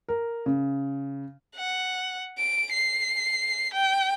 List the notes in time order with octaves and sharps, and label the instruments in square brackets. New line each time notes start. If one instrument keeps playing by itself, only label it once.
[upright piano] A#4
C#3
[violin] F#5
D7
C7
G5